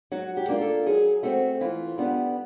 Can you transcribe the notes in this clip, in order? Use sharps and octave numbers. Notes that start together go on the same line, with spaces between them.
F#3 F#4
G4
A#3 D4 F4
A4
F#3 G#4
A3 C4 F#4
E3 F4
G3 B3 D4